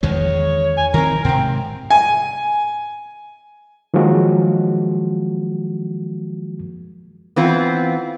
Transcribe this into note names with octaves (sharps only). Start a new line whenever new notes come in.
E2 D#3 G#3 C#5
G#5
D#3 C4 A#4
G#2 C3 C4
G#5
D#3 F3 F#3 G#3 A#3 F#4
E3 B3 C4 F4